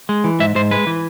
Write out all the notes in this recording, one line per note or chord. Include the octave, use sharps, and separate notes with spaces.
G#3
E3
G#2 E5
G#2 C5
G#3 B4
E3